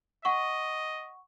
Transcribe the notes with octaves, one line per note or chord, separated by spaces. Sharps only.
D#5 F#5 C#6